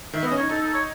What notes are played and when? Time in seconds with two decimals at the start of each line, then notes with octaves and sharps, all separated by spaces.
0.14 D#3 E5
0.23 B3
0.26 D#5
0.32 C#4
0.37 D#4 C#5
0.49 D#4 A4
0.61 A4
0.74 C#5